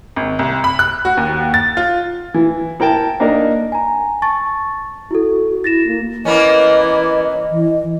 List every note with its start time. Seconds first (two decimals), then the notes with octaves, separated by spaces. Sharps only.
0.16 G#1
0.39 C2
0.64 B5
0.79 F#6
1.05 F#4
1.17 D#2
1.54 A6
1.77 F4
2.34 E3
2.80 E4 A#4 G5 A5
3.20 A#3 D4 D#4 A#4
3.72 G#5 A#5
4.22 A5 C#6 A6
5.11 E4 F#4 A4
5.64 E4 A6 A#6 E7
5.87 A#3
6.25 E3 A#3 B3 C#4 D#5
7.51 E3